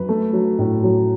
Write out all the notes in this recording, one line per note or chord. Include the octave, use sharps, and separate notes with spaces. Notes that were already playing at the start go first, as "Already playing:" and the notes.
Already playing: F#2 B4
A3
F#3
A2
F#3